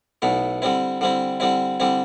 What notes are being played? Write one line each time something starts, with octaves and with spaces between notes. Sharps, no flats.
B1 B2 A3 E4
D3 G3 C4 E4
D3 G3 C4 E4
D3 G3 C4 E4
D3 G3 C4 E4